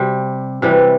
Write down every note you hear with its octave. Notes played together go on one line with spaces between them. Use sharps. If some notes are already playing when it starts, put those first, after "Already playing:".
Already playing: C3 G3 G4
C3 E3 G3